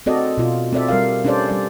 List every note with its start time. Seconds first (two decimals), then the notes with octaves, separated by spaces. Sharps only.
0.06 C4 F#4 A4 D5 D#5
0.38 B2 F4
0.73 C4 A4 D5 E5
0.88 G3 A#4 F5
1.25 C#4 D4 G4 A4 C5 D5
1.49 G3 D5